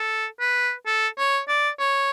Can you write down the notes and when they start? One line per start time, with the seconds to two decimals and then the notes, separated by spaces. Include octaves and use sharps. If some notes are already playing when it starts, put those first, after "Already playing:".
Already playing: A4
0.40 B4
0.86 A4
1.18 C#5
1.48 D5
1.79 C#5